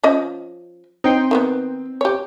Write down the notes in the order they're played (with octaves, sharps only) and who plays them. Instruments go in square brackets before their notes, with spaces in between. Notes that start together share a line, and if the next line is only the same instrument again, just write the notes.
[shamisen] F3 C#4 D#5
[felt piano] C4 [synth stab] D#4 G5 C6
[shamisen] D#3 G3 B3
G4 C#5